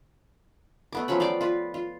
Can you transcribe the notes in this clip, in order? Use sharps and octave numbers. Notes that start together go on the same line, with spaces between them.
A3 B3 D6
F3 F#3 C#4 B5
D5 F5 G5 D6
F4 B4
F4